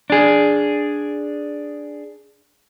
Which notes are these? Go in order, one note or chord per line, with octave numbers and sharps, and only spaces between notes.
D4 G#4